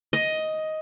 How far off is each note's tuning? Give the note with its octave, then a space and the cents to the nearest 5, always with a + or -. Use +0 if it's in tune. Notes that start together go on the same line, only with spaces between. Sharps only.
D#5 +10